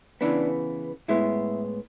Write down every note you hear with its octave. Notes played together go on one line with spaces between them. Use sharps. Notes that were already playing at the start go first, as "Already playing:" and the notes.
C#3 E3 B3 D4
A2 G#3 B3 E4